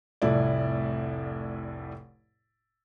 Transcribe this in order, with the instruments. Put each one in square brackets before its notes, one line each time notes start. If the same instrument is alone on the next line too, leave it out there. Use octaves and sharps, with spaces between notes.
[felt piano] F1 C2 A2 E4 A4 D5